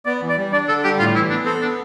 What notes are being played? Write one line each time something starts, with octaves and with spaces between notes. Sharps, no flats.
B3 D5
E3
D5
G3
D4 D5
D3 A4
G3 G4
A2 F4
E3 E4
B3 D4
C4 A4
B3 D4